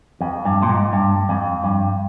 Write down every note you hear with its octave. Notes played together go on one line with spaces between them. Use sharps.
F2
G2
A#2
G#2
G2
F2
G2